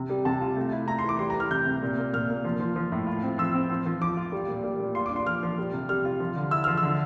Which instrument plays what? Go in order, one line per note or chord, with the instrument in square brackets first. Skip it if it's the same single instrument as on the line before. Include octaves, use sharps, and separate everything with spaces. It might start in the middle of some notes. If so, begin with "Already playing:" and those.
Already playing: [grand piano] C3
G3
C3 A5
F4
A3
E4
A3 A#5
C6
E3 D6
G3 C6
A#5
E3
F6
C3 G6
C3
A#2
A#3
A#2 F6
A#3
F3
F3
F3
A2
F4
C4
F3 E6
C4
F3
F3
F3 D6
F4
G3
A#2
G3
A#2
F4 C6
D6
D4
C6
F3 F6
F3
G3
C3
G3 F6
F4
F3
D3
E4 E6
F3 F6
E6
D3